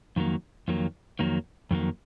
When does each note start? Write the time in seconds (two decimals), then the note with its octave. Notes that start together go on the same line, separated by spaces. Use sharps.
0.16 F2 D#3 F#3 A#3
0.68 F2 D#3 F#3 A#3
1.19 F2 D#3 F#3 A#3
1.71 F2 D#3 F#3 A#3